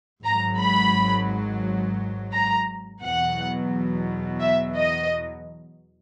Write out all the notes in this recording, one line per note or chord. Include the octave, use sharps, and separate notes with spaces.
G#1 G#2 F#3 A#5
B5
A#5
E2 B2 F#3 F#5
E5
D#5